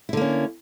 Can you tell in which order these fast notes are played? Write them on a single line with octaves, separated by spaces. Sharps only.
E4 D3 A#3 C#4